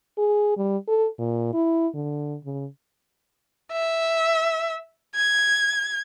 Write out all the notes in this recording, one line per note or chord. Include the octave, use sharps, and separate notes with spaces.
G#4
G3
A4
A#2
E4
D3
C#3
E5
G#6